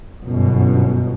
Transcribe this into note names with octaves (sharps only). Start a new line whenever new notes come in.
G1 F#2 B2